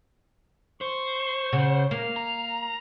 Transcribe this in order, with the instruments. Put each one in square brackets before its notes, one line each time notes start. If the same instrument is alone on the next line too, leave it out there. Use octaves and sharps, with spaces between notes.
[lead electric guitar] C5 [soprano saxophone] C#6
[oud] C#3 [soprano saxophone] F#5
[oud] A#3 [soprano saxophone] F5
[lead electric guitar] A#5